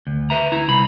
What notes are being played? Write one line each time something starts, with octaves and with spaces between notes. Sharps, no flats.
D2
B4 E5 A#5
E4 A#5
C2 B5